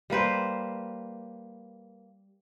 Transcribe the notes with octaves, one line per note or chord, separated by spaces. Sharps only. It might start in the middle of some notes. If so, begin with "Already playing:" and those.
G3 A#3 B4 C5